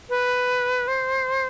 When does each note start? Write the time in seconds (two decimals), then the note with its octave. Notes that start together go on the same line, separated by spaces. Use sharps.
0.09 B4
0.88 C5